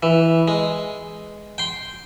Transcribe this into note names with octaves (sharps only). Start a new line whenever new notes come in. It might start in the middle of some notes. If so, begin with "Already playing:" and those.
E3
G#3
G5 C6